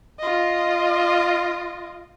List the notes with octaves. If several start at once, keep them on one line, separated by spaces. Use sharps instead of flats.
F4 D#5